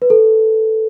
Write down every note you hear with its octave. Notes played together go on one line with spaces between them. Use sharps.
B4
A4